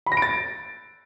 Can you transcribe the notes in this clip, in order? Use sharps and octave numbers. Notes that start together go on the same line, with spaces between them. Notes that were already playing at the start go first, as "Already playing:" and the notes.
B5
A#6
D7
A6